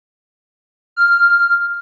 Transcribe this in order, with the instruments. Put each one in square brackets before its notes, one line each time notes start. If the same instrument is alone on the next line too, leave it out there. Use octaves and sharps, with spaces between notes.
[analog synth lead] F6